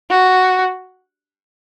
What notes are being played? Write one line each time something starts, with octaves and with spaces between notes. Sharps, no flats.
F#4